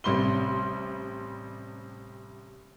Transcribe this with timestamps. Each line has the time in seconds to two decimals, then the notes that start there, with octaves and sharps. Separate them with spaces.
0.04 A1 C3 G3 C6 G7